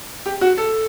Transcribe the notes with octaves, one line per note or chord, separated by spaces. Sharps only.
G4
F#4
A4